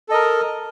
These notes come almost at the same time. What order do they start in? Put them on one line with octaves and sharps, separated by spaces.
A4 D#5 A#4